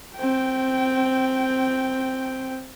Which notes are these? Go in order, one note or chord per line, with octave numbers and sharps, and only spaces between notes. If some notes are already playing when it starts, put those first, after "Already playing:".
C4 G5